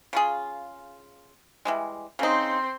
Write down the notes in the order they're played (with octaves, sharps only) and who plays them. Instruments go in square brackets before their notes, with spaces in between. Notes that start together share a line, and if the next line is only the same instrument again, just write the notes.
[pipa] C#3 F4 G#4
E3 G3 G#3
[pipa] C#3 D#4 [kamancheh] C4 C5